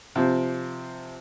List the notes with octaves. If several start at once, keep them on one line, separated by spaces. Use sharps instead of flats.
C3 F3 C4